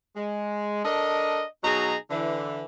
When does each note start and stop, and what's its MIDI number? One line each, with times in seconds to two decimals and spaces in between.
0.17 0.82 56
0.85 1.43 62
0.85 1.43 69
0.85 1.43 70
0.85 1.43 75
1.64 1.96 47
1.64 1.96 54
1.64 1.96 63
1.64 1.96 68
1.64 1.96 82
2.11 2.63 50
2.11 2.63 52